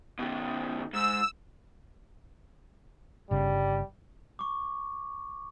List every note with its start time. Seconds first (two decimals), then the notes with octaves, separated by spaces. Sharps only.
0.19 B2 D#3
0.93 G#2 E6
3.31 G1 C#3 G3
4.39 C#6 D6